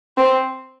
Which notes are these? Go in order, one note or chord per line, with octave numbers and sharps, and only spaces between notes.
C4